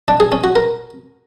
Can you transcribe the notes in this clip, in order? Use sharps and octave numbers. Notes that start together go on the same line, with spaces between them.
D4
G#4
C#4
F#4
A#4